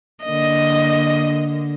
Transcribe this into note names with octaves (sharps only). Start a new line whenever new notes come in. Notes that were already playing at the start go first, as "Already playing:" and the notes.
D3 A#3 D#5